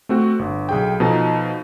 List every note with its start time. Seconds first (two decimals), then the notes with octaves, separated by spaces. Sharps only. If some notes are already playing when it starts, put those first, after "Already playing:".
0.09 A3 C4 F#4
0.39 G1
0.69 B1 G#4 G5
1.00 B2 F3 D#4 A4